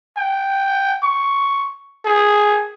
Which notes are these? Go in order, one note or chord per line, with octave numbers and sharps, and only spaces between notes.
G5
C#6
G#4